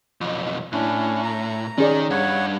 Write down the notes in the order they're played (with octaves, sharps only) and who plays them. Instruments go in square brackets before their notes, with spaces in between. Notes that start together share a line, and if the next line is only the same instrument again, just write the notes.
[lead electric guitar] B1 F2
[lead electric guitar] A2 [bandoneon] C#4 D4
[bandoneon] A#5
[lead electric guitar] D#3 [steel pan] C#4 G#4 D5
[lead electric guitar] G2 [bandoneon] C#5 F#5